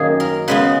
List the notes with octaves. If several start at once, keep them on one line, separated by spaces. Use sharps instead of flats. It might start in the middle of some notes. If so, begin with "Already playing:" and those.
Already playing: F#2 D#3 A#3 G#4
A#4
C#3 G#3 B3 B4